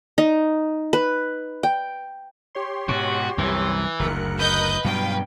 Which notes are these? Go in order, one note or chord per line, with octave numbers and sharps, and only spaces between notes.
D#4
B4
G5
G4 C#5 C6
G#2 B2 F#4
C2 F#2 E3
F#1 D2 A#4 F#6 C#7
B4 D#5 G6
G2 B2 F#3 F5 G5